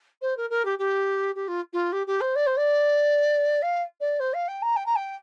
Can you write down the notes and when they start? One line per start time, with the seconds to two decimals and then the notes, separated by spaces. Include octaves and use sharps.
0.21 C5
0.37 A#4
0.50 A#4
0.65 G4
0.78 G4
1.35 G4
1.48 F4
1.73 F4
1.92 G4
2.07 G4
2.20 C5
2.35 D5
2.46 C5
2.57 D5
3.62 F5
4.00 D5
4.19 C5
4.33 F5
4.48 G5
4.62 A#5
4.76 G5
4.86 A#5
4.95 G5